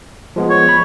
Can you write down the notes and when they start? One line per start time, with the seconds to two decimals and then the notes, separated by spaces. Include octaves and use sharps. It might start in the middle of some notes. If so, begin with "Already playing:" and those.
0.36 F3 G#3 B3
0.50 C#5
0.69 B5